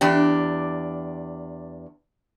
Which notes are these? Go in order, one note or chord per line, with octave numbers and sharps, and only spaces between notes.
E2 D4 G4